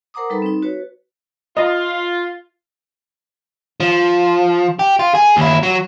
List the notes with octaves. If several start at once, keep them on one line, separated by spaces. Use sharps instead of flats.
A#4 C5 F#5 A#5 D6 D#6
G3 D#4 A4 B4 B5
C4 D#4
F#4 B4 C#5
F4 D#5
F3
G4
F4
G#4
D#2 E4
F#3